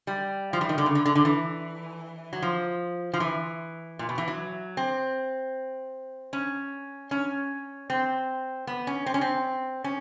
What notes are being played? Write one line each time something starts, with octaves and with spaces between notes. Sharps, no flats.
G3
F3
E3
D#3
D3
C#3
D3
D3
D3
E3
F#3
F3
F3
E3
A#2
B2
E3
F#3
C4
C#4
C#4
C4
B3
C#4
C4
C#4
C4
C#4